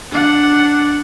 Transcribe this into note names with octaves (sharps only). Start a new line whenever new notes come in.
D4 F#5